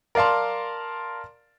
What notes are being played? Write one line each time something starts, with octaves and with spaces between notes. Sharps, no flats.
A#4 D5 F5 A5 C6